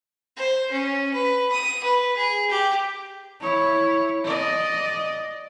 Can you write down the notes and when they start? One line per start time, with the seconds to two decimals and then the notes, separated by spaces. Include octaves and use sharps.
0.37 C5
0.71 C#4
1.13 B4
1.52 D#6
1.84 B4
2.16 G#4
2.50 G4
3.40 E4 C#5
4.24 D5 D#5